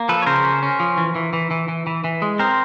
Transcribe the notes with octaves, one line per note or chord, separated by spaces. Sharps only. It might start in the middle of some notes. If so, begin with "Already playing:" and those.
Already playing: A#3
F3 A4 B4
C#5
C#3 A#4 C5
C#4
C#4
F3
E3
E3
E3
E3
E3
E3
E3
G#3
C4 A#4 C5